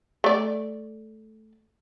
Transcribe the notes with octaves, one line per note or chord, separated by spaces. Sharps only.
A3 D5